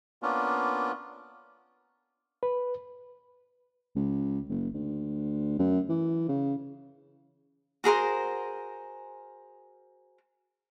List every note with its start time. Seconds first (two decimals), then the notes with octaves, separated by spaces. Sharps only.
0.22 A#3 B3 C#4 D4 F4
2.43 B4
3.96 C#2
4.49 F#1
4.74 D2
5.59 F#2
5.89 E3
6.29 C#3
7.84 F#4 G#4 A#4 C5